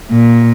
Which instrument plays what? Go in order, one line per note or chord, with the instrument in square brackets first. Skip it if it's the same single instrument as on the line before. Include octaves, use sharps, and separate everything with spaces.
[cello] A#2